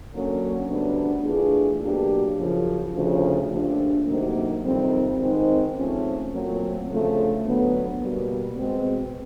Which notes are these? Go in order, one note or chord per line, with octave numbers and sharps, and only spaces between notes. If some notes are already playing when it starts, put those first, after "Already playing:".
D3 F#3 A#3 C#4
D2 D3 G3 B3 D4
E3 A3 D4 F4 G#4
B2 F#3 A#3 D4 G4
F#2 C#3 F3
D2 C#3 F3
A#2 F3 A3 D4 G4
D2 C3 D#3 F#3 A#3
F2 C3 D#3 G3 C4
G#2 D#3 G#3 C4
G#2 F3 A3 C#4
A#2 F#3 A3 C4
D2 C#3 F3 A3
D2 D3 F#3 B3
B2 G3 A#3
B2 G#3 C4